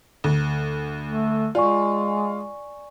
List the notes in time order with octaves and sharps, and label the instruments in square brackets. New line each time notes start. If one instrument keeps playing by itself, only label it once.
[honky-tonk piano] D2
[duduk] A3
[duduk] G#3 [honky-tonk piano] F4 [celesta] D5 G#5 C#6